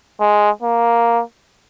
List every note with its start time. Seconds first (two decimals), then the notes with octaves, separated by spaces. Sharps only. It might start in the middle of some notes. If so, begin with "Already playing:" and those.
0.20 G#3
0.62 A#3